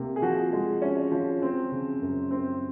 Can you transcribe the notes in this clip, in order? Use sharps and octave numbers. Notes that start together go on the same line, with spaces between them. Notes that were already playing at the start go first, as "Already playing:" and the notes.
Already playing: C3 A#3
G#4
F3 F#4
G#3
C#4
F3
C4
C#3
F#2
C4